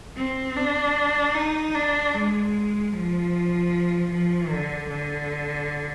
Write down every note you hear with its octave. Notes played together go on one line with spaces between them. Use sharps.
C4
D4
D#4
D4
G#3
F3
F3
D3
D3